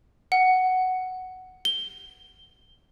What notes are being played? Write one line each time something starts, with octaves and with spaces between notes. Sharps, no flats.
F#5
G7